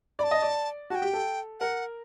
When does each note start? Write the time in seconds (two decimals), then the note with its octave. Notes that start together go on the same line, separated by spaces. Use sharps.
0.19 D5 B5
0.23 A5
0.31 D#5
0.42 D5
0.90 F#4 A5
0.95 G5
1.02 G4
1.13 A4
1.60 A#4 F#5